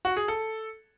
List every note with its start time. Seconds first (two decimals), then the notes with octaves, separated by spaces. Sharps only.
0.05 F#4
0.17 G#4
0.28 A4